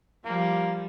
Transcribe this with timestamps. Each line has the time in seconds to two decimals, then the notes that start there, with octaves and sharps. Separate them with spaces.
0.25 F3 G3 A#3